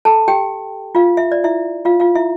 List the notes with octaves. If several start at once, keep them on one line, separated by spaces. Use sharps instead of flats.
A4 A5
G4 G5
F4 F5
E5
D5
E4 E5
F4 F5
F4 F5
E4 E5